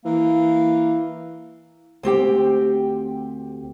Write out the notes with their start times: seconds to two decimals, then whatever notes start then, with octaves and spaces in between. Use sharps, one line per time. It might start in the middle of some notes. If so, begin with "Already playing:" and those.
0.05 E3 A#3
2.03 D2 C4 G4 G5